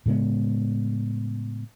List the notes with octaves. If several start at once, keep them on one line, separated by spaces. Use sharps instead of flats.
A2 C#3 G#3 B3